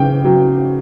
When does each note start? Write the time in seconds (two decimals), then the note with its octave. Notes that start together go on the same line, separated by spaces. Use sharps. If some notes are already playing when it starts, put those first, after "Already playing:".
Already playing: C#3 G5
0.25 F#3